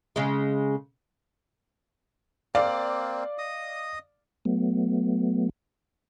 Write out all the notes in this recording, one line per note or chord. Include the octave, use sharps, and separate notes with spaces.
C#3 G#3
A#3 C4 D5 F5
D#5 D#6
F#3 A3 B3